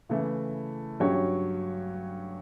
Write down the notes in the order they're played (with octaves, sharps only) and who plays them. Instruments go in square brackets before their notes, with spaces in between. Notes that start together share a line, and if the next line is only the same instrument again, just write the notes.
[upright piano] C#3 E3 A3 E4
G2 F#3 C#4 G4 C#5